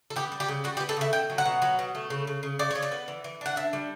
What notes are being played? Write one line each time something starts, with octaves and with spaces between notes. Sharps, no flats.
A4
B3 G4
G3
G4
C#3
G3 F#4
G4
B3
A4
C#3 E5
B2 G5
F#3
F#5
B2
F#3
B2
A3
C#3
C#3
C#3
C#3 D5
C#3 C#5
D5
B3
E3
E3
D4 F#5
D4 E5
G3